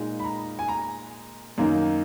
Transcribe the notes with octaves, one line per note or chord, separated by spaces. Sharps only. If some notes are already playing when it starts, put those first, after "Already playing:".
Already playing: A#2 G#3 D#4
B5
A#5
G#5
A#5
F#2 D#3 A#3 D#4